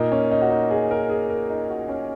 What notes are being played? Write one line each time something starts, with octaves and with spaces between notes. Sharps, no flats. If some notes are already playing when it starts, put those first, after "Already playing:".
Already playing: A#2 A#3 D#4
C#4
D#4
F#4
D#4
G#4
A#4
G#4
A#4
D#4
F#4
C#4